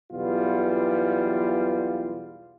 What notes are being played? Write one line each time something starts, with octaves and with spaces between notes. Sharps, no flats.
B1 E2 G3 B3 F4